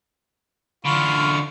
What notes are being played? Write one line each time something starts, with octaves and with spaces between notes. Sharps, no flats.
D3 E3 F4 B5 C#6